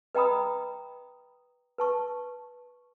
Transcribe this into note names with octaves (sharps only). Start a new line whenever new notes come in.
B4 D#5 G5 A#5 B5 D#6
B4 A5 C#6